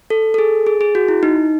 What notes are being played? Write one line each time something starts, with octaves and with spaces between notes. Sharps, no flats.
A4
A4
G#4
G#4
G#4
F#4
E4
D#4